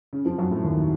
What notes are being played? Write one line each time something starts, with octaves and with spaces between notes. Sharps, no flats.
C#3 C#4
F2 F3
F#2 F#3
A2 A3
D#2 D#3